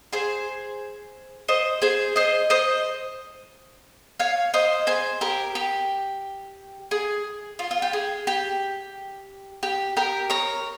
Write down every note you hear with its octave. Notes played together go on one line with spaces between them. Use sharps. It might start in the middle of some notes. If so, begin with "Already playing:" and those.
G#4 C5
C5 D#5
G#4 C5
C5 D#5
C5 D#5
C#5 F5
C5 D#5
G#4 C5
G4 A#4
G4
G#4
F4
F4
G4
G#4
G4
G4
G4 A#4
A#4 C#5